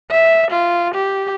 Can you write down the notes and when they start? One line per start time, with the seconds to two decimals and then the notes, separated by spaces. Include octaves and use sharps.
0.11 E5
0.51 F4
0.94 G4